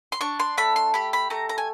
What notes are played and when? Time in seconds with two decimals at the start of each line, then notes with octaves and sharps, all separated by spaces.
0.12 C6
0.21 D4 C#6
0.40 C6
0.58 A3 B5
0.76 C6
0.94 G4 B5
1.13 B5
1.30 A3 A#5
1.49 A#5
1.58 G#5